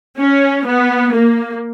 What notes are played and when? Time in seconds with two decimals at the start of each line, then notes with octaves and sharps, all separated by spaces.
0.20 C#4
0.66 B3
1.13 A#3